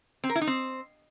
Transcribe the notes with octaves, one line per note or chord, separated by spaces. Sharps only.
C4
A#4
E4
D#4
C4